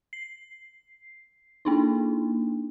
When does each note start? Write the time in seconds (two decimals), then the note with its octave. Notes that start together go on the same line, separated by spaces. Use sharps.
0.13 C7
1.65 A#3 D4 D#4